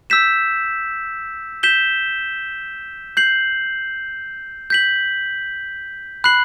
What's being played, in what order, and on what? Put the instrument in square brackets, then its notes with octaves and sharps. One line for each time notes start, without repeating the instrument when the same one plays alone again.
[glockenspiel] E6 G6 B6 E7
G6 B6 E7 G7
G6 C7 F#7
G6 B6 F#7
B5 F#6 C7 F#7